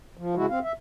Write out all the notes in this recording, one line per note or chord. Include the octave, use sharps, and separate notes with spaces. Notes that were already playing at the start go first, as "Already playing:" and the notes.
F3
C#3 G#3 E4 F#4
C4 F5
E5